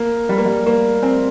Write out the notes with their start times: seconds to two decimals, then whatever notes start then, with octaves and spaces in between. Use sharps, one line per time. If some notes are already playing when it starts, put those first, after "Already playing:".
Already playing: A#3
0.29 G3
0.38 A#3
0.46 G3
0.66 A#3
1.03 C4